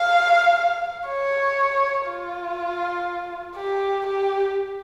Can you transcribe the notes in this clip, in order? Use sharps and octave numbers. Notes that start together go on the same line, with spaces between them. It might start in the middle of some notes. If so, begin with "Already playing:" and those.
Already playing: F5
C#5
F4
G4
G4